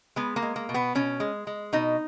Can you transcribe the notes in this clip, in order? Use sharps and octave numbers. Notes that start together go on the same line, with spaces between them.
G#3 B3
A#3
G#3
A#3
B2
B3
B2 C#4
G#3
G#3
B2 D#4